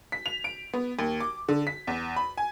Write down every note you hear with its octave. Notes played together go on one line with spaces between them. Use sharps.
B6
F7
D7
B3
D#2
D6
D3
B6
E2
B5
G#5